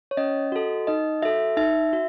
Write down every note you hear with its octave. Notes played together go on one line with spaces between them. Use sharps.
C#5
C#4 D#5
F#4 A4
D#4 D#5
F#4 A4 E5
D#4 E5
F#4